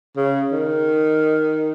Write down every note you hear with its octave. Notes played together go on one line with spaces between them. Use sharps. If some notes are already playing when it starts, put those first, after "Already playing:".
C#3
D#3